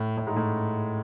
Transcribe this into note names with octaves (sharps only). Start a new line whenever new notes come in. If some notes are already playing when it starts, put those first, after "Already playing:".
Already playing: A2
A2
G#2
A2